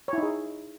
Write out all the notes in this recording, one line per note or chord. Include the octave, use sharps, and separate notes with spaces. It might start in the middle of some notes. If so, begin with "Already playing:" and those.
D#4 E4 G#4 C#5